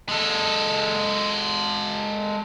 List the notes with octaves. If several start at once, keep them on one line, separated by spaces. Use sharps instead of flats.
G#3 A4